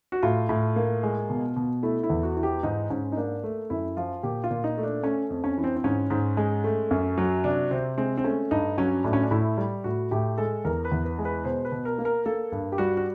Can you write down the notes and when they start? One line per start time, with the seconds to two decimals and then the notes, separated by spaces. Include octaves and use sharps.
0.12 F#4
0.23 A2 F4
0.49 A2
0.76 A#3
1.03 G#3
1.30 B2
1.56 B2
1.83 A3 E4
2.03 E4
2.10 E2
2.23 F#4
2.37 E3
2.43 G4
2.63 G#2 D#4
2.90 G#2 C#4
3.12 D#4
3.17 A#3 D4
3.43 A3
3.70 F#2 E4
3.97 F3 F4
4.23 A#2 G4
4.44 F4
4.51 A#2
4.64 D#4
4.78 A3
4.83 D4
5.04 A3 C#4
5.30 F2
5.44 C#4
5.58 E3
5.64 C4
5.76 C4
5.84 G#2 C#4
6.10 G#2
6.37 G#3
6.64 A3
6.91 F#2
7.18 F#3
7.44 C3 D4
7.71 C3 C4
7.98 G#3 C4
8.17 C4
8.24 A3 C#4
8.51 G2 D#4
8.78 F#3 C#4
9.04 A2 D4
9.13 C#4
9.22 D4
9.31 A2 E4
9.58 G3
9.84 A2 F#4
10.11 A2 G4
10.38 G#3 A4
10.65 E2 A#4
10.85 B4
10.92 E2
11.05 B4
11.19 G#3
11.25 B4
11.45 B2 C5
11.65 B4
11.72 B2
11.85 A#4
11.98 A#3
12.05 A#4
12.26 A#3 A4
12.52 G2
12.72 G4
12.78 G3 F#4
12.97 F#4